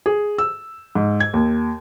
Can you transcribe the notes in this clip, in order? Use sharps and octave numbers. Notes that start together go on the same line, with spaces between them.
G#4
E6
G#2
G#6
D#2